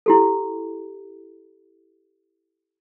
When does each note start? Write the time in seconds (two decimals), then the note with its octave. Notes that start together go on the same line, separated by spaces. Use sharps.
0.06 E4 G4 A4